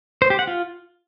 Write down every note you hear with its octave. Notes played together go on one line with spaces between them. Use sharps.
C5
G4
F#5
F4